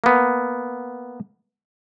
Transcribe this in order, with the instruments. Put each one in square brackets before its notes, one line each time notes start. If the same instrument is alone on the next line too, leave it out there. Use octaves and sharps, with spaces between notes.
[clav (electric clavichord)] A#3 B3